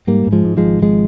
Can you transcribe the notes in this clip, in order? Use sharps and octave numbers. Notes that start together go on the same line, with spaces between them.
G#2 G3 A#3
G#2
F3 G#3
G#2
F3 G#3
G#1
G#1 F3 G#3